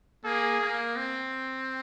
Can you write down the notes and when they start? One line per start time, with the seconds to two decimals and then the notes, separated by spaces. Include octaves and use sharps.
0.24 A#3 G#4
0.61 A#3
0.96 C4